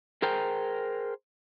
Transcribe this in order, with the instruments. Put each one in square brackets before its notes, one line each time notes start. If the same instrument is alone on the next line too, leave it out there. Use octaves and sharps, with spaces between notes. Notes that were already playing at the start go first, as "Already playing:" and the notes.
[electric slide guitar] G#4 A#4 C5 G5 A#5